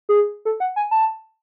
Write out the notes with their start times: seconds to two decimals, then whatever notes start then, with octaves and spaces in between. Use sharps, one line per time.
0.09 G#4
0.45 A4
0.60 F#5
0.76 G#5
0.91 A5